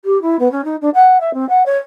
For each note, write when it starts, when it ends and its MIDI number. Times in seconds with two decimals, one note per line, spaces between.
0.05 0.20 67
0.22 0.36 64
0.39 0.51 59
0.52 0.64 61
0.64 0.76 63
0.81 0.89 62
0.94 1.20 78
1.20 1.33 76
1.34 1.47 60
1.49 1.63 78
1.66 1.78 73